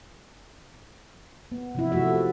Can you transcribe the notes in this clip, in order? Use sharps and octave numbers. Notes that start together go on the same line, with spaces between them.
B3
C3 F3 E4
C3 F3 A3 F#4 E5
A4